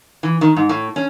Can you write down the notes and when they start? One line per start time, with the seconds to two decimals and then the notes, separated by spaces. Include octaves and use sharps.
0.23 E3
0.41 D#3
0.56 G#2
0.69 A2
0.96 C#4